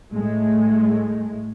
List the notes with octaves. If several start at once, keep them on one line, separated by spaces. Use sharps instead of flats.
A2 G#3 A3